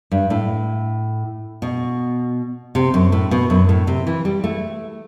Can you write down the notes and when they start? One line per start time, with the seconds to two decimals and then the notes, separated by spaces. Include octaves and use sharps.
0.11 G2
0.30 A2
1.62 B2
2.75 C3
2.94 F#2
3.12 A2
3.31 B2
3.50 F#2
3.69 A2
3.87 C3
4.07 E3
4.25 G3
4.44 A3